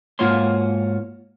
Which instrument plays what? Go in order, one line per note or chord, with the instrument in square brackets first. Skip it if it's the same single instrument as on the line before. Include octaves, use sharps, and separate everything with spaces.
[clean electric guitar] G#2 A#3 F4 F#4 C#5 C6